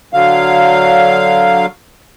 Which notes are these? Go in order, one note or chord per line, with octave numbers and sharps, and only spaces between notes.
D3 F#3 F5